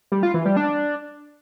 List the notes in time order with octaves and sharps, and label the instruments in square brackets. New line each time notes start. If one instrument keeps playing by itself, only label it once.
[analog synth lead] G3
F4
E3
G3
D4